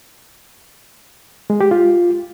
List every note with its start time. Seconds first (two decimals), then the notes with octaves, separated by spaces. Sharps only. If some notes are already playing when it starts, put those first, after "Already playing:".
1.50 G#3
1.61 G4
1.71 F4